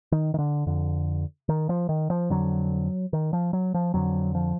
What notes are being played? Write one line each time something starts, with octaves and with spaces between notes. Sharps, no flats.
D#3
D#3
D3
F2 D3
D#3
F3
D#3
F3
F2 D3 F#3
D#3
F3
F#3
F3
F2 D3 F#3
F3